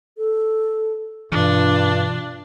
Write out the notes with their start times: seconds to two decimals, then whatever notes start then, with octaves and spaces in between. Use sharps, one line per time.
0.17 A4
1.32 G2 B2 E3 D4 F4